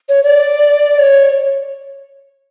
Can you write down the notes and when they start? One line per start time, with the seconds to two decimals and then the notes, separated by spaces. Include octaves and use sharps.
0.09 C#5
0.23 D5
0.98 C#5